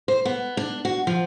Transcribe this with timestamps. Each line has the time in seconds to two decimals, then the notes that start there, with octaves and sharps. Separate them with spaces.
0.08 C5
0.25 B3
0.57 D4
0.85 F#4
1.07 F3